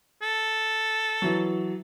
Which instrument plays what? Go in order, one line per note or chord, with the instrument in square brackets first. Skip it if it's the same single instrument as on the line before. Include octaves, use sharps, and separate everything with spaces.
[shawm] A4
[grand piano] E3 F#3